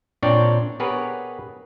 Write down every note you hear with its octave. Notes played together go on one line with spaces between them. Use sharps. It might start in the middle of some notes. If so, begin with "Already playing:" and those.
A#2 C4 D4 C#5 D5 G5
B3 G4 G#4 A#4 B4 C#5